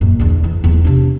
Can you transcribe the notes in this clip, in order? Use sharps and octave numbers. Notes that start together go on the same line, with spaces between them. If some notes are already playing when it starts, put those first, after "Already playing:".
F#2 A#2
E2 D3
E3
E2 F#3
C3 D4